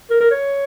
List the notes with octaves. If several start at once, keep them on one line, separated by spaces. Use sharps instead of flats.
A#4
A#4
C#5